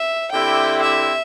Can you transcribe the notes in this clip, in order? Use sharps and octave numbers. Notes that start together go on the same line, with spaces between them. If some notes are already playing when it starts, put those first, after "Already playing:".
Already playing: E5
D3 C4 E4 G4 G5
E5